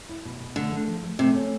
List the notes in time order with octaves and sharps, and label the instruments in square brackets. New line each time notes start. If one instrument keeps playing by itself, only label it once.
[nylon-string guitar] E4
B2
B2
[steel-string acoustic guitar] D3 [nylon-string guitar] A3
[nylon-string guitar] A3
F3
A3
[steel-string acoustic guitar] C3 [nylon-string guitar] A3
[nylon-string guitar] C#4